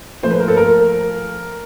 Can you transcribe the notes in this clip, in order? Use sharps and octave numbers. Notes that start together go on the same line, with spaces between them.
A#2 F3 A3 C5
B4
A#4
A4
A#4